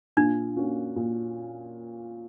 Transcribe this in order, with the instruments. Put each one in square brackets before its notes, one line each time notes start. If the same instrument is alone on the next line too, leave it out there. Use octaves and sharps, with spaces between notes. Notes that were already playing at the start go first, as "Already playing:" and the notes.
[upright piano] A#2 [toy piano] D4
[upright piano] A#3 C#4 F#4
A#2